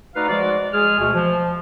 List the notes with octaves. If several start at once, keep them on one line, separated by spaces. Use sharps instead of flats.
A3 D#4 F#4 B4 D5 F5
F3 G#3 F#4 D5
G#3 G#4 F6
D2 B2
F3